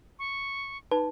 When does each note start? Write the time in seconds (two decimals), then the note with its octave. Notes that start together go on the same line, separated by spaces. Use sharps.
0.19 C#6
0.91 D#4 B4 A5